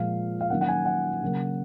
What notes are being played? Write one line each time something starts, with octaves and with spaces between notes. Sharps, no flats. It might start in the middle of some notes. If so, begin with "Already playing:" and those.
Already playing: A#2 F3 G#3 F5
F5
D#3 F#3 A#3 C#4 F#5
F#5
G#5
F#5
C#3 F#3 A#3